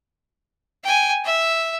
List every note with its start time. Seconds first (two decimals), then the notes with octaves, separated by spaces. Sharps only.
0.84 G5 G#5
1.24 E5